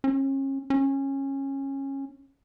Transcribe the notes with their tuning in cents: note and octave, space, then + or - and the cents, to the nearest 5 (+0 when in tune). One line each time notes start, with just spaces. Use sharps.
C#4 -35
C#4 -20